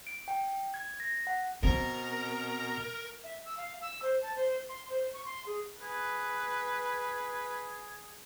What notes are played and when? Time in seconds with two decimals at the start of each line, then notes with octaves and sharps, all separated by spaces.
0.07 D7
0.28 G5
0.74 G#6
1.00 A#6
1.27 F#5
1.63 B2 C4 A#4 A#5
3.24 E5
3.45 E6
3.57 F5
3.82 E6
4.03 C5
4.23 A5
4.36 C5
4.69 C6
4.90 C5
5.14 C#6
5.25 C6
5.46 G#4
5.82 G#4 B4